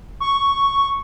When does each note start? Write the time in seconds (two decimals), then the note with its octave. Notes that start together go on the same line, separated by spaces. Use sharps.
0.20 C#6